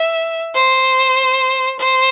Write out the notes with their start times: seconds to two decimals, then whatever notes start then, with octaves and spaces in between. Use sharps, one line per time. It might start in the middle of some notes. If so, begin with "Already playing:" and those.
Already playing: E5
0.54 C5
1.79 C5